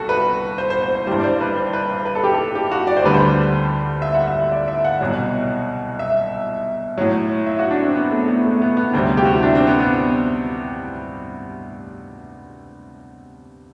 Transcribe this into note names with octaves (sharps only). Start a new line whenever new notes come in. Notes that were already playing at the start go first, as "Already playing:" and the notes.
Already playing: C2 F#4 A4
B4
C5
C5
C5
C5
G2 E3 G3 C5
D5
C5
B4
C5
B4
B4
B4
A4
G4
A4
G4
F#4
D5
C5
D2 D3 G3 B4
C5
E5
F#5
E5
E5
D5
E5
F#5
C2 B2 F#3
E5
A2 F#3
E5
F#4
D4
C4
B3
A3
B3
A3
B3
B3
D2 C3 G3 C4
G4
F#4
E4
D4
C4
B3
B3